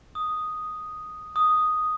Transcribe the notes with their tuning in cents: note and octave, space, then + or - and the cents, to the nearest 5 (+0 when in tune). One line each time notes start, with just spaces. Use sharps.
D#6 +0
D#6 +0